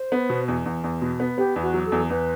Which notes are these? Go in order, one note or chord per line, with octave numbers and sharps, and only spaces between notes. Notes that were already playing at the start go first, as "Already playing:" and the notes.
Already playing: C5
B3
B2
E2
E2
E2
B2
B3
B3 G4
E2
F#4
F#3
A4
E2
E2 B4